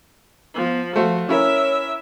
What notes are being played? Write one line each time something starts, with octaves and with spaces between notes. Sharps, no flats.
F3 B3
F3 A3 F#4 C5 F5
C#4 E4 A#4 C#5 E5